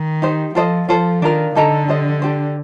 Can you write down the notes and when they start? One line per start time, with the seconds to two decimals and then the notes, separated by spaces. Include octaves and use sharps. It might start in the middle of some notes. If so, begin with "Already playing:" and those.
Already playing: D#3
0.22 D#4 G4 C5
0.55 F3 F4 A4 C5 D#5
0.89 F3 F4 A4 C5
1.22 D#3 D4 F4 A#4
1.55 D3 D#4 A4 D#5 A#5
1.88 G4 C5 D#5
2.22 D4 G4 C5